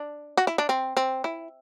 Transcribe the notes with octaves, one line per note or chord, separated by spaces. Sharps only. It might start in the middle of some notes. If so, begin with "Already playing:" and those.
Already playing: D4
F#4
E4
D4
C4
C4
E4